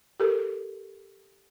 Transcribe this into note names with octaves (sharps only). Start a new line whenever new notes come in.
G4 A4 A#4